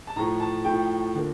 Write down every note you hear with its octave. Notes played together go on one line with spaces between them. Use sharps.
A5
A2 F3 A3 A#5
A5
A2 F3 A3 G5
D3 F3 A#3